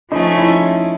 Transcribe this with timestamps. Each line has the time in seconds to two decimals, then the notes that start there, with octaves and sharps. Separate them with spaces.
0.11 F3 A3 C#4 D#4
0.37 E4